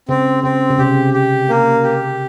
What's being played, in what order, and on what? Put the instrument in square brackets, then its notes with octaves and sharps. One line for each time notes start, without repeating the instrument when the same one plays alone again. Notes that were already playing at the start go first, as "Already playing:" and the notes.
[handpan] C#3 [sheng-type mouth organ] C4
[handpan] C#3 [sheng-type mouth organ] C4
[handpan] C#3
[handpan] C3 [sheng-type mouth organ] G4
[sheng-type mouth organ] G4
A#3
G4